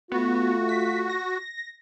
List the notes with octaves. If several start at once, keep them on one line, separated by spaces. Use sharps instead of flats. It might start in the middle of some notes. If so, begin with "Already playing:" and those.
A3 B3 F4 F#4
B6
A#6